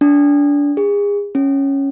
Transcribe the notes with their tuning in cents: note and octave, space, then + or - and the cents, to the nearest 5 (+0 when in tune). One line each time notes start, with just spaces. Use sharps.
D4 -25
G#4 -35
C#4 -5